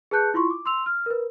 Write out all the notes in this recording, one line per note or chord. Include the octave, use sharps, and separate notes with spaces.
G#4 B4 A5 F#6 G6 C#7
E4 F4 C6 C#6
D6
C6 E6 F7
F6
A#4 B4